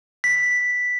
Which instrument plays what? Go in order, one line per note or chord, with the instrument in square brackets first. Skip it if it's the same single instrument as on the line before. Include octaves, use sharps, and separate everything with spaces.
[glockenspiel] B6